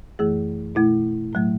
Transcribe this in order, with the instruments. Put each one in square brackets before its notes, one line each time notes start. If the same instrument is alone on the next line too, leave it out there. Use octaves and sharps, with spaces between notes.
[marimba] F#2 E3 A3 G#4
B2 A3 E4
A2 F#3 A3